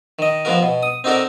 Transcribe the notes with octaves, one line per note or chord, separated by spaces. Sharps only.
D#3 D#5
F3 G#3 B3 F#4 A#4
B2
D#6
C4 D#4 F#4 A4 A#4 D5